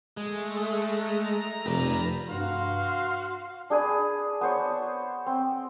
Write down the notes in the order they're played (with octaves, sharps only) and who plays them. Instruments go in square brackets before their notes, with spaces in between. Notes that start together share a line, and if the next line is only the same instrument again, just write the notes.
[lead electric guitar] G#3 [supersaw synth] A3
[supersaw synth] A#5
[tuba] F1 [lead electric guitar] B4 D5
[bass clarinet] G2 [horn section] F#4 F5 C6
[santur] D4 G#4 G#5 B5
B3 C5 C#5
C4